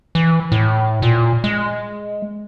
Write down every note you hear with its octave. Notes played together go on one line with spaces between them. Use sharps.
E3
A2
A#2
G#3